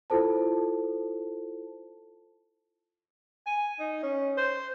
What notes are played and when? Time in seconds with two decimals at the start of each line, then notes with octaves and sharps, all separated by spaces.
0.10 E4 F4 A4 C5 A5
3.46 G#5
3.79 D#4
4.03 C#4
4.37 C5